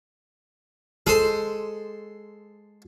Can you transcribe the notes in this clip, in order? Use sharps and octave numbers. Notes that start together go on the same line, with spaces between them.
G#3 A4 C5 C6